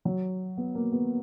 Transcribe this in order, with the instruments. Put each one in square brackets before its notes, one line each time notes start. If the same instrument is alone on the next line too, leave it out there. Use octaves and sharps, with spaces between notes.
[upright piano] F#3
B3
A#3
B3